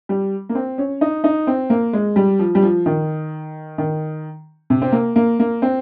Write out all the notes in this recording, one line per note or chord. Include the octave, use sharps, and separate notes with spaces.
G3
A#3
C4
C#4
D#4
D#4
C4
A#3
G#3
G3
F3
G3
F3
D#3
D#3
C3
C4
A#3
A#3
A#3
C4